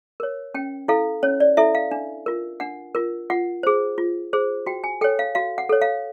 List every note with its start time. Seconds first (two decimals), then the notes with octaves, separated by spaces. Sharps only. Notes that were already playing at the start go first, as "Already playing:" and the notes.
0.20 A#4 C#5
0.54 C#4 G5
0.88 E4 A4 F5
1.23 C#4 C#5
1.40 D5
1.57 E4 A4 E5
1.75 F5
1.91 D4
2.26 F4 A#4
2.60 D4 F#5
2.95 F4 A#4
3.30 F4 F#5
3.63 G#4 C5
3.98 F4
4.33 G#4 C5
4.66 F#4 G5
4.84 G#5
5.01 A4 C#5 G5
5.19 F5
5.35 F#4 F5
5.58 F#5
5.69 A4 C#5
5.82 F5